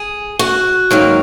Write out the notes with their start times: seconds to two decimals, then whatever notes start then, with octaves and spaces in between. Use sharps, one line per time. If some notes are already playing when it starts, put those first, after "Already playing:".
Already playing: G#4
0.39 F#4
0.91 G#2 D#3 F#3 A#3